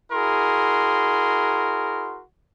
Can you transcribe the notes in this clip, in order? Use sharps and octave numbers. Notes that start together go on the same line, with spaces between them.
E4 F#4 G#4 A#4 C6